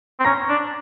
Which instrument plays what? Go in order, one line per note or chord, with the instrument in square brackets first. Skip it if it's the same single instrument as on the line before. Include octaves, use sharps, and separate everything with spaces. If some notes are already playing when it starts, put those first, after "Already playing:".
[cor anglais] C4
[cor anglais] C#4 [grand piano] A#5 A#6
[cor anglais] D4